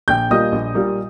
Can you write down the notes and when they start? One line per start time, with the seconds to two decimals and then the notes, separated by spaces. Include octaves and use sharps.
0.08 A#1 G5 G6
0.30 A#2 G3 A#3 F4 D#5 D#6
0.52 A#1
0.74 A#2 G3 A#3 F4